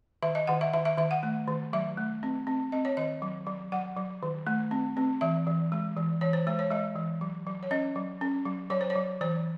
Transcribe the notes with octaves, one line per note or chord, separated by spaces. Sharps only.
D#3 E5
D#5
D#3 F#5
E5
D#3 E5
E5
D#3 E5
F#5
A3
D#3
F#3 E5
A3
C4
C4
C4 D#5
C#5
D#3 D#5
F#3
F#3
F#3 F#5
F#3
D#3
A3
C4
C4
E3 E5
E3
G#3
E3
E3 C#5
C5
G#3 C5
C#5
G#3 D#5
E3
F#3
F#3
C#5
C#4 D#5
F#3
C#4
F#3
F#3 C#5
C5
C#5
F#3
E3 C5